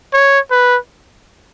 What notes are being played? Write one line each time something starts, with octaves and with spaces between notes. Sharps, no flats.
C#5
B4